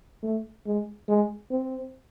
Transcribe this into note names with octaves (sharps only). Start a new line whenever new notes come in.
A3
G#3
G#3
C4